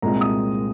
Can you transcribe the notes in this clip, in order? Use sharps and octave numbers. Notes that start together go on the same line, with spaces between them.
C2 A#2 G#3 C4 A#5
D#6